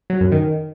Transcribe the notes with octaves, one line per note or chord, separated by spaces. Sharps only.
F#3
F#2
D#3